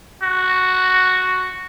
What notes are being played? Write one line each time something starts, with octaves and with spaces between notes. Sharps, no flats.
F#4